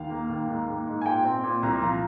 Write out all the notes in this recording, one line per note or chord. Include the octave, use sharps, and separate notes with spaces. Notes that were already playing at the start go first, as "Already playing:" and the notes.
Already playing: D#2 F5
A#3
D#2
G#2
A#3
G#2
G#5
A#2 G5
C4
A#2
C2 A#5
F3 A#5